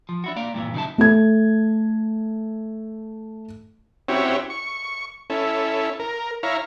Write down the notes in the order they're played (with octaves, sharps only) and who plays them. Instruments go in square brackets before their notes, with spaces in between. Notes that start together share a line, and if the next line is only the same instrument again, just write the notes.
[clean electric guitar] F3
D4 E4 F#4
A#3 D5 F5
G2 A#2 E3
C#3 F#3 D#4 E4 A5
[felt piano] A3 A4 G#6
[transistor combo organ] C4 C#4 E4 F#4 G4 C#5
C#6
C#4 E4 A4
A#4
E4 C#5 F5 A#5